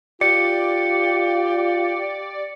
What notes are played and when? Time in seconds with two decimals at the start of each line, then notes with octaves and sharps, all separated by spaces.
0.21 F4 G4 D5 C#7